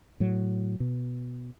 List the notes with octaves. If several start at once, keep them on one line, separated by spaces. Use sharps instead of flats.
A2 F#3
B2